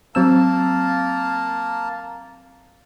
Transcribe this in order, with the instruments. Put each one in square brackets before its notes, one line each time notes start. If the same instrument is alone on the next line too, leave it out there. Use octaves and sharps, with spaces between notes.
[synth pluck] F#3 C4 E6 [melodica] A#3 A#4 A5